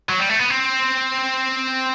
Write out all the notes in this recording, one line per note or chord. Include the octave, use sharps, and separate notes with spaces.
F#3
G3
A3
B3
C4